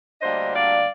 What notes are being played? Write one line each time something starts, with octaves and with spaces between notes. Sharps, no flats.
D2 D3 G3 A#3 D4 C5 D#5
D5 F5